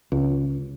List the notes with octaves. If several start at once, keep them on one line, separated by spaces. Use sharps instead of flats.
C#2